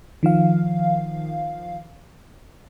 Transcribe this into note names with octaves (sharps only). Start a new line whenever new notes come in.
D#3 F3 F5